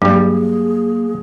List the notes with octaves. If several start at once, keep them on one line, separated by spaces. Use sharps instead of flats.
G2 F#3 G3 A#3 G#4